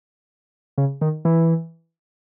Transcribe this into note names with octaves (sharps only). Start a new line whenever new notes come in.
C#3
D#3
E3